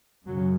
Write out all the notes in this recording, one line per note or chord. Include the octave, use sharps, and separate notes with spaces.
F#2 C#3 F#3